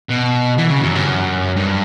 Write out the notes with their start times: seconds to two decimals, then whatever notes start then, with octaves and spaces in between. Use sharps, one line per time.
0.09 B2
0.58 E3
0.71 C#3
0.82 F#2
0.96 G2
1.07 F#2
1.57 G2